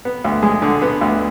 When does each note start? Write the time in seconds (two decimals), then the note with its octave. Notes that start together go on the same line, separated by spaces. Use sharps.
0.05 B3
0.24 D2
0.43 G#3
0.62 D3
0.82 B3
1.01 D2